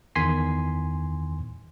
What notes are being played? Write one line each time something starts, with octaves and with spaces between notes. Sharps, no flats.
E2 D#3 G#5 C6 B6 C7